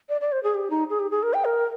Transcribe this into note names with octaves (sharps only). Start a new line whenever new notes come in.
D5
D5
C5
G#4
G4
D#4
G#4
G4
G#4
A#4
G5
A#4